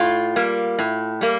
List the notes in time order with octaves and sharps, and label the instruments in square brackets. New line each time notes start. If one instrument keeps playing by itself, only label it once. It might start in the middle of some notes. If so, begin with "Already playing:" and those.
Already playing: [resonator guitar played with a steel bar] A2 F4
G3 A#3
A2
G3 A#3